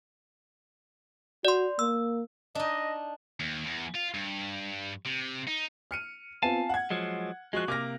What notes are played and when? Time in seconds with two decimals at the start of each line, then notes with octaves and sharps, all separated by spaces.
1.45 F#4 D5 C6
1.79 A#3 E6
2.55 D4 D#4 D#5
3.40 D#2
3.65 E2
3.94 F4
4.14 G2
5.06 C3
5.47 D#4
5.91 F6 C#7 D#7
6.43 B3 C4 F4 F5 G#5 A5
6.69 F#5 G#6
6.90 F3 F#3 G#3
7.53 F3 G#3 F#4 C#6 F#6
7.68 C3 A#3 D6 F6 A#6